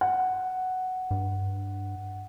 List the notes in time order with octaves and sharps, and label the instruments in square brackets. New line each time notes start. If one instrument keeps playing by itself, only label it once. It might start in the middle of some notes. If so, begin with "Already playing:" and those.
[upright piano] F#5
[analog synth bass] G2